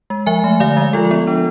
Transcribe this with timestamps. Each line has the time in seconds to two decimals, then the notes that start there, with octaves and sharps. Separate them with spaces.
0.10 G#3
0.26 F3 E5 G#5
0.44 A3
0.60 D3 D5 F5
0.77 G#3
0.93 F3 F4 A4
1.11 B3
1.27 D4